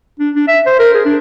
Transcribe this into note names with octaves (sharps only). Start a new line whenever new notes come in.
D4
D4
E5
C5
A#4
G#4
D4